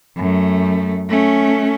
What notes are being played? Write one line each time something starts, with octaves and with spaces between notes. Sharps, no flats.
F#2 A3
A3 C#4